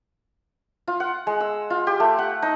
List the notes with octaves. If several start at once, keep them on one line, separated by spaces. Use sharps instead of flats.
F4
F#5
G#3
E6
F4
G4
A3
F#5
D#4